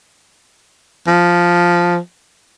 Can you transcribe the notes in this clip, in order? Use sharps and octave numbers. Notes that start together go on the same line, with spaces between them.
F3